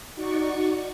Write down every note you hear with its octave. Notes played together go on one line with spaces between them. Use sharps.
D#4 F#4 D5 C#6